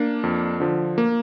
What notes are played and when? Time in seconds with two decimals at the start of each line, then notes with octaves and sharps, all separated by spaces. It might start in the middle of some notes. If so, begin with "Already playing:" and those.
Already playing: A#3 D4
0.24 F2
0.60 D3 F3
0.98 A#3